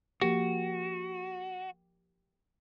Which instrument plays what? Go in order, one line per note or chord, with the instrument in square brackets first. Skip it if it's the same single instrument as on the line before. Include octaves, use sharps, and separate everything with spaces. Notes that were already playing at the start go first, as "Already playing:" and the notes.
[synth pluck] F3 A#3 G4 [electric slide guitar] F#4